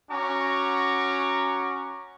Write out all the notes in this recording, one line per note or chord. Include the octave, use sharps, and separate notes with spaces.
C#4 F#4 F#5 A#5 C#6 D6